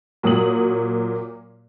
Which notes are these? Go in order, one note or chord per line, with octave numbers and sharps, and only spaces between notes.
A#2 F#3 F#4 D#6 F#7